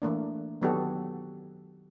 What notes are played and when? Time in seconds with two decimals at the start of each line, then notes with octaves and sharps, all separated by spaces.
0.02 E3 A3 A#3 D4
0.62 D#3 F#3 B3 F#4 G4 A4